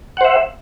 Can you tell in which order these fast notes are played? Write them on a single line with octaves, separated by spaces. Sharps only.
F#5 C5 E5